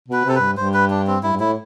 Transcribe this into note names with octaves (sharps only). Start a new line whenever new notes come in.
B2 B4
C3 A4
G2 B4
G2 C5
B4
D4
C4
G2 E4
G2
A2 E4